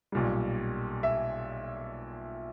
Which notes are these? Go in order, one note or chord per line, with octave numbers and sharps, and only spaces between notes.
B1 A#2 G3
E5